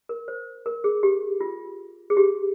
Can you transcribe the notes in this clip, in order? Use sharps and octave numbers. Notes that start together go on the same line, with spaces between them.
A#4
C5
A#4
G#4
G4
F4
G#4
G4